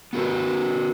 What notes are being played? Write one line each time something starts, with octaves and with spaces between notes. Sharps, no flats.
B3 F#4 A#4 B4